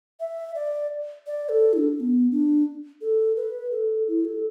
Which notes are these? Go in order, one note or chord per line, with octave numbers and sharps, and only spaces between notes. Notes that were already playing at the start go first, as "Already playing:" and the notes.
E5
D5
D5
A4
E4
D4
D4
B3
D4
A4
B4
A4
E4
A4